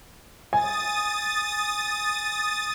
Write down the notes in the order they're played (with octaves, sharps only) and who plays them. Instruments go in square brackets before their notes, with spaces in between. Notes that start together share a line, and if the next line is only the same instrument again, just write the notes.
[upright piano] G#5 [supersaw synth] D#6 A6